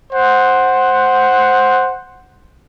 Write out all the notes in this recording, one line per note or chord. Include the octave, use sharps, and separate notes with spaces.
C5 F#5